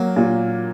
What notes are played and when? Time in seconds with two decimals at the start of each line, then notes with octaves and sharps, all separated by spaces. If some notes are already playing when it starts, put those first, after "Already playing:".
Already playing: F#3 A#3
0.16 A#2